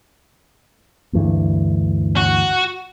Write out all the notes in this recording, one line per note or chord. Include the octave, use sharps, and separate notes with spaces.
D2 G2 E3
F#4